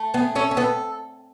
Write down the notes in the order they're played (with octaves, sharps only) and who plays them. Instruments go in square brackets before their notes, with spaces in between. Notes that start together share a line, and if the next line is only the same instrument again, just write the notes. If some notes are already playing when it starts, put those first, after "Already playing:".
Already playing: [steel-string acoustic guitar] A3
[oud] B3 [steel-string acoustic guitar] G#4
[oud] C#4 [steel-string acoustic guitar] A4
[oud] C#4
[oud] B3 [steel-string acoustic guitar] A4